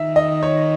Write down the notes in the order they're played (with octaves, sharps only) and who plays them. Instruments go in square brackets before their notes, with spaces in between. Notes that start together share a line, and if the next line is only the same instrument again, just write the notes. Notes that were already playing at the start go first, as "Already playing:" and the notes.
Already playing: [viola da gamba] D#3 [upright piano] E5
[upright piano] D#5
C#5